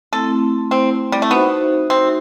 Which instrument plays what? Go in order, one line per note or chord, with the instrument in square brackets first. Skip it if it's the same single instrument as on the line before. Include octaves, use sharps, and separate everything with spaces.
[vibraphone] A3 C4 E4 [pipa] A4
[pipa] C4
G3
A3
[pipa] B3 [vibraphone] D#4 F#4 C5 E5
[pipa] C4